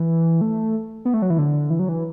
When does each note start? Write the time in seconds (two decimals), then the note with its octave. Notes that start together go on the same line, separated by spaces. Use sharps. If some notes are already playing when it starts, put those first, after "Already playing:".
Already playing: E3
0.41 A3
1.05 B3
1.14 A3
1.22 F#3
1.30 E3
1.38 D3
1.70 E3
1.79 F#3
1.89 E3